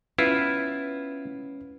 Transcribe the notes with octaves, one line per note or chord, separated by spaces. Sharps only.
B3 C#4 E4 F4 B4